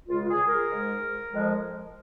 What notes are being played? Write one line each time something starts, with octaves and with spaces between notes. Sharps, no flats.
C#2 C#3 G#3 F4
G#4
A#4
G#2 G#3
F2 F3 G#3